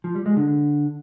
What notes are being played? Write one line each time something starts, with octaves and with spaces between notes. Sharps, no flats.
F3
G3
G#3
D3